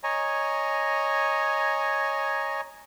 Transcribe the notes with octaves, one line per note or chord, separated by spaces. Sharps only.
C#5 D#5 G#5 A#5